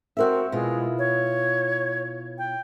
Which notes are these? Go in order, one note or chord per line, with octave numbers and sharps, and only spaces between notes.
C4 F#4 A#4 E5
B2 G#3 E4 F4
C#5
G5